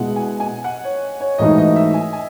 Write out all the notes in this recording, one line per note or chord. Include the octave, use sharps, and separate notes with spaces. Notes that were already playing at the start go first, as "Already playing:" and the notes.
Already playing: B2 G#3 B3 E4 F#5
G#5
G#5
F#5
C#5
C#5
G#2 E3 A3 D#4 F#4 D#5
D#5
E5
G#5
G#5